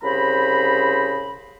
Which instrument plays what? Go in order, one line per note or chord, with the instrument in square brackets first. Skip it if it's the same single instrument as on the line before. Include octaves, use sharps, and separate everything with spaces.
[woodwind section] C2 C#3 C5 A#5 B5